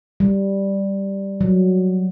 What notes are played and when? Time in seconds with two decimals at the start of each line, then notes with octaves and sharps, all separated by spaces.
0.20 G3
1.41 F#3